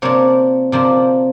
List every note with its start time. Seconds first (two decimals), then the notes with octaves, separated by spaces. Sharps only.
0.02 C3 F3 A#3 D4 C#5
0.72 C3 F3 A#3 D4